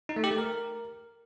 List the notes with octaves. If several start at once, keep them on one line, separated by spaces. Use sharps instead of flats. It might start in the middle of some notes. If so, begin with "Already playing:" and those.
D#4
A3
G4
A3
A#4